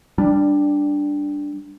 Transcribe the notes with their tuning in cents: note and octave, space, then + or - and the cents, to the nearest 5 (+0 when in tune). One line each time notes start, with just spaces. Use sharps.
G3 +10 D4 +0